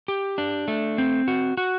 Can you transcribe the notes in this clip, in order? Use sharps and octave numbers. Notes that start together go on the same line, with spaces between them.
G4
D4
A3
C4
F#4
F#4